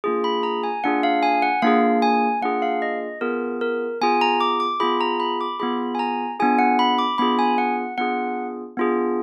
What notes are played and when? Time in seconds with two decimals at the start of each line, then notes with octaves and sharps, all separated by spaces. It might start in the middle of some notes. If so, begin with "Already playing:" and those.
0.04 A#3 D4 F4 G#4
0.24 B5
0.43 A#5
0.63 G#5
0.84 A#3 D4 F4 G#4 F#5
1.03 F5
1.23 G#5
1.42 F#5
1.62 A#3 D4 F4 G#4 F5
2.02 G#5
2.42 A#3 D4 F4 G#4 F#5
2.62 F5
2.82 D#5
3.21 B3 F4 G#4 A#4
3.61 A#4
4.01 B3 F4 G#4 G#5
4.21 A#5
4.41 D6
4.60 D6
4.80 B3 F4 G#4 B5
5.01 A#5
5.20 B5
5.41 D6
5.60 B3 F4 G#4 B5
5.95 G#5
5.99 A#5
6.40 B3 D4 F4 G#4 G#5
6.59 F#5
6.79 B5
6.98 D6
7.18 B3 D4 F4 G#4 B5
7.39 G#5
7.58 F#5
7.98 B3 D4 F4 G#4 F#5
8.77 B3 D4 F4 G#4